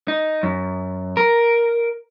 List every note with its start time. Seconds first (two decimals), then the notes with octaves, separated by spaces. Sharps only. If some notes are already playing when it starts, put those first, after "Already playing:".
0.08 D#4
0.43 F#2
1.17 A#4